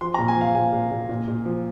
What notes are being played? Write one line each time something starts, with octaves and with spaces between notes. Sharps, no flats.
F3 C6
A#2 A#5
G#5
F3 F5
A#2 G#5
A#2
A#2
A#2
A#2
F3